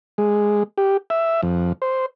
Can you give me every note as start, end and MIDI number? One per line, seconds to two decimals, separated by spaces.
0.18 0.63 56
0.78 0.97 67
1.10 1.41 76
1.43 1.73 41
1.82 2.06 72